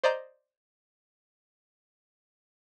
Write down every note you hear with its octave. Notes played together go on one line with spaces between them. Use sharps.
C5 D5 D#5 A#5 G6